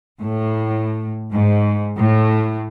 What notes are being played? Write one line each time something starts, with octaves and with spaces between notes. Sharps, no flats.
A2
G#2
A2